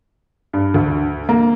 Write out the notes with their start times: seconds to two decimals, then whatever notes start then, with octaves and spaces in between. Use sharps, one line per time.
0.53 G2
0.74 D2
1.29 A#3